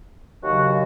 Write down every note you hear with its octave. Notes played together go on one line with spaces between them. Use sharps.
D#2 C#3 F#3 F#4